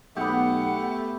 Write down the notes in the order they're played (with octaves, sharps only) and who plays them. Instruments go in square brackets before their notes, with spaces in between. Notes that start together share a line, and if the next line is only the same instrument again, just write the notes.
[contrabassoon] B1 [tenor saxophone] A3 [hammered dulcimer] B3 G4 [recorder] F#5